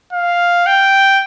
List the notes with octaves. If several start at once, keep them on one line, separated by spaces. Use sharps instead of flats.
F5
G5